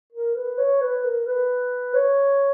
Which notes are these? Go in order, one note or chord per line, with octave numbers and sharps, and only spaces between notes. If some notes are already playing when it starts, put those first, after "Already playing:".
A#4
B4
C#5
B4
A#4
B4
C#5